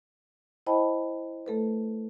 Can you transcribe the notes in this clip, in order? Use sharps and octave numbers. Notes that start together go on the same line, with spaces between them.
E4 C5 D#5 G5 A5 B5
A3 A4 B4